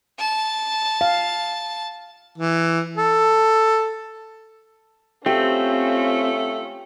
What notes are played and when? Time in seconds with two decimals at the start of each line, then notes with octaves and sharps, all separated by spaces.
0.19 A5
1.01 F5
2.38 E3
2.97 A4
5.26 A3 C4 C#4 F4 G4